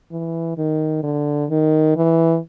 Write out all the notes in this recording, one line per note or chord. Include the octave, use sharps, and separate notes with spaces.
E3
D#3
D3
D#3
E3